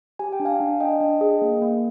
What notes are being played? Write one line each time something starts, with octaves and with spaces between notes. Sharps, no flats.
G4 G#5
G5
D4
F5 G#5
D4
D4 D#5 G5
D4
G#4
A#3
A#3